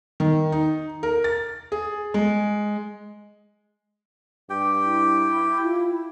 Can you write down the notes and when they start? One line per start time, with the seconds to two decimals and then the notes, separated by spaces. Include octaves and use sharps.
0.20 D#3
0.52 D#4
1.03 A#4
1.24 A6
1.72 G#4
2.14 G#3
4.50 G2 G4 G5
4.83 E4
5.64 F4